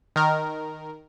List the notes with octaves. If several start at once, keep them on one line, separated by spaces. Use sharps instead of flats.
D#3 A#4